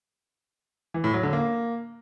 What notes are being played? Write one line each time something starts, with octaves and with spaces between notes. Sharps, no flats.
E3
A2
F#3
D3
A#3